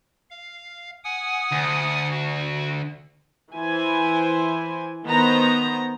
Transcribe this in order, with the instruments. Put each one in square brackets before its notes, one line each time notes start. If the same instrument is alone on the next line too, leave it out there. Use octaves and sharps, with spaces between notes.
[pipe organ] F5
F#5 G#5 D#6
[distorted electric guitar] D2
[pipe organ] F#4
[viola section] E3 E4 C5 G#5
D#3 B3 C5 A#5